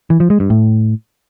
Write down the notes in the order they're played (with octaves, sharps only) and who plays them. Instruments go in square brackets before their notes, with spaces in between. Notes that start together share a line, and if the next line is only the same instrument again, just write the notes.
[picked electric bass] E3
F3
G#3
G2
A2